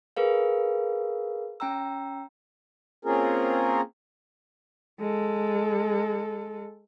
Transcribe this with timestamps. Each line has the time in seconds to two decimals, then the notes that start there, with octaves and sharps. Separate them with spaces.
0.17 G#4 A#4 B4 F5
1.60 C#4 G5 A#5 E6
3.05 A#3 C4 C#4 F4 G#4 A#4
5.00 G#3 A4